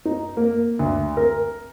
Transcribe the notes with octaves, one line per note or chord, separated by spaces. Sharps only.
D#4
A#3
D2
A#4